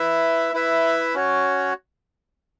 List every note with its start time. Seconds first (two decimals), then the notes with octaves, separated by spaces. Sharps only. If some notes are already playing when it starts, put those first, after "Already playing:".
Already playing: E4 B4 E5
0.54 E4 B4 E5
1.14 C#4 F#4 C#5